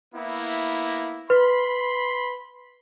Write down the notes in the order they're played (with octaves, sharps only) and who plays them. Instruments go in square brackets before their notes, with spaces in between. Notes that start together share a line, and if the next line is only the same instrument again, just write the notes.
[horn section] A#3 B3 E4
[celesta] B4 [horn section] B5 C6